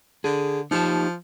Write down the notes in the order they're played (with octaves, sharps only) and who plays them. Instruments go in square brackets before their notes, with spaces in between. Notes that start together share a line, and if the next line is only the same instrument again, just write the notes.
[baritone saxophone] D3 [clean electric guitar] G#4
[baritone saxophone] F3 [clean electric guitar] D#4 G4 A5